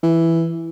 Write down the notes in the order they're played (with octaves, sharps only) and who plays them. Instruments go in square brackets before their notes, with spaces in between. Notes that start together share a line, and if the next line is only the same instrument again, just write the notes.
[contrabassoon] E3